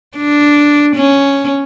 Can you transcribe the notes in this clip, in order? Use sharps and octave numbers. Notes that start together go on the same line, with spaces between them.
D4
C#4